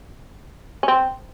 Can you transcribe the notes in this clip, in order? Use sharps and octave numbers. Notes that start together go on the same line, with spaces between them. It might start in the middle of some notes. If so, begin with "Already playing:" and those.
C#4
C4